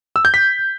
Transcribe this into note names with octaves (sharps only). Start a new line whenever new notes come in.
E6
G6
B6